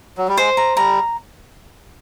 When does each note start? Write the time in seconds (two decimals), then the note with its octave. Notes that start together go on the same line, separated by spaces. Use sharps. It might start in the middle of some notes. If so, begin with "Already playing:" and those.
0.18 F#3
0.28 G3
0.37 G#3 C5
0.57 A#5
0.76 G3 A#5